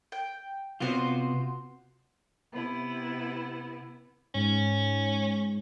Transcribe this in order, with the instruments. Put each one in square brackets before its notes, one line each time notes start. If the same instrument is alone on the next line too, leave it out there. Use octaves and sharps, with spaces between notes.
[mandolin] G5
[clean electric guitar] C3 B3 F4 [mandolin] F#4 C5
[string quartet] C3 B3 E4
[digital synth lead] G#2 [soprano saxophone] C#4